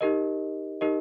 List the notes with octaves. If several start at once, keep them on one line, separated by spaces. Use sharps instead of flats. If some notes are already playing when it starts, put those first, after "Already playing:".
D#4 G4 A#4 D#5
D#4 G4 A#4 D#5